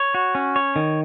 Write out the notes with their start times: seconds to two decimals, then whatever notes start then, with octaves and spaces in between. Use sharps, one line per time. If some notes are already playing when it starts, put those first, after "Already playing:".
Already playing: C#5
0.14 F#4
0.35 C#4
0.56 C#5
0.76 D#3